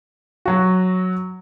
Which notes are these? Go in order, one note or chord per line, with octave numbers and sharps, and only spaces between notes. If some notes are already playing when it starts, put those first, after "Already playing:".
F#3 F#4